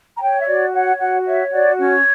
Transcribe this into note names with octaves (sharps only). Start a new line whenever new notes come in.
A#5
C#5 G5
E5
F#4 D5
C#5 F#5
F#4 F#5
C#5 E5
F#4 D5
C#4 C#5